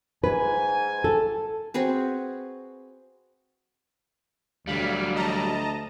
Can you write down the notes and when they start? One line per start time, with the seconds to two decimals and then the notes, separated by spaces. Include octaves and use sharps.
0.24 G#2 B4 G#5
1.04 A4
1.74 C4 F#4 G#4 B4
4.67 D2 F#3 G3 F5
5.15 D#5 A5 A#5